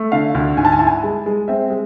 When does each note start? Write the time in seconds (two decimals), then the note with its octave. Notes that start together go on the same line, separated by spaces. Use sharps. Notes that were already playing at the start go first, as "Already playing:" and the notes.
Already playing: A3
0.12 D3 F5
0.35 D2
0.57 G#2 G#5
0.65 A5
0.72 G#5
0.79 E4 A5
0.87 G#5
1.03 G#3
1.26 G#3
1.48 C4 E5
1.70 G#3